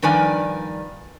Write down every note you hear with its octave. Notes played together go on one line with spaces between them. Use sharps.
G2 D#3 F3 B4 D5 G#5